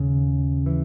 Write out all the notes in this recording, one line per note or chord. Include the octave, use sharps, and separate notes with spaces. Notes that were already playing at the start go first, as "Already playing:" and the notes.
Already playing: D#2 C#3
E3